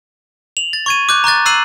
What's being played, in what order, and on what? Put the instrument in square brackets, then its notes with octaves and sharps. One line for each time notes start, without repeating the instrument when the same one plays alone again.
[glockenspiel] F7 F#7
A6
C#6 G#6 D#7
D6 F#6 G6
A#5 C#6 F#6 A6
A#5 E6 F#6 C7 D#7 F#7